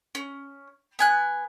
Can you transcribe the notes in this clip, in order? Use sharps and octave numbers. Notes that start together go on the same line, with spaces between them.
C#4
B3 G#5 F#6